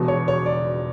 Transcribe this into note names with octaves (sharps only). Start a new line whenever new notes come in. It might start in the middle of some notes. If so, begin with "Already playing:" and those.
Already playing: E1 E2 B2
C#5
C#5
D5